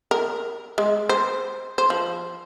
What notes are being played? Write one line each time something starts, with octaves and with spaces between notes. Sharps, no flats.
A#4
G#3
C5
C5
F3